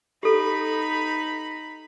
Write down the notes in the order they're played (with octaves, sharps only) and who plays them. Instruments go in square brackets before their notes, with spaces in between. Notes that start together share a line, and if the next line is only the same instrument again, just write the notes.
[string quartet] D#4 B5 [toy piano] G4 A4